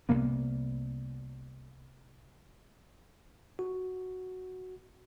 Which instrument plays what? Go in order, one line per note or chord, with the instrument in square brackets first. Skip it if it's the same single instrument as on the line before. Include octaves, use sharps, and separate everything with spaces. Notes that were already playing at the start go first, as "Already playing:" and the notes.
[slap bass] C2 C3 A#3 B3
[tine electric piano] F#4